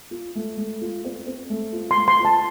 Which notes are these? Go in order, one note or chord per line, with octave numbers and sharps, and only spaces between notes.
F4
A3
A3
F4
C4
C4
A3
F4
C6
A3
C6
F4
A5